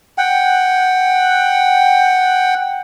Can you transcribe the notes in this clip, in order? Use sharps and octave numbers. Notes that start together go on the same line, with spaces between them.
F#5 G5